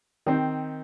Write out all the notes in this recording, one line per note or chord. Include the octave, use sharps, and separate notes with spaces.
D#3 C4